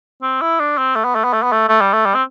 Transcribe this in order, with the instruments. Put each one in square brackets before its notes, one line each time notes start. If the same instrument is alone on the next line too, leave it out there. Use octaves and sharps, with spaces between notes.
[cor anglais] C4
E4
D4
C4
A3
B3
A3
B3
A3
B3
A3
A3
G3
A3
G3
C4